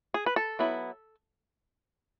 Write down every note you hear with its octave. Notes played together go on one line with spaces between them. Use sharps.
G#4
B4
A4
F#3 B3 E4